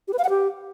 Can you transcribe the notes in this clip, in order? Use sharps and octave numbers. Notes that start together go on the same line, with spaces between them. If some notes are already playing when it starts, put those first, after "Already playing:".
G4
B4
F5
F#5
G4